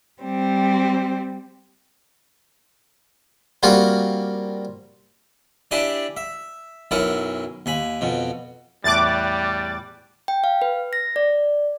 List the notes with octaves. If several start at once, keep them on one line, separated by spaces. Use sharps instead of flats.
G3 C4
G3 A#3 C4 F4 F#4
D4 E4 G4 D5 G#5
E5
B1 F#2 E4 A#4 C#5 G#5
D#2 G#5 B5
F2 B2
E2 A2 G3 D6 F#6 A6
G5
F5
B4
A#6
D5